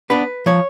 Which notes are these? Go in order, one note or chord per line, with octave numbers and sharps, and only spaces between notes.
B3 D4 B4
F3 C#5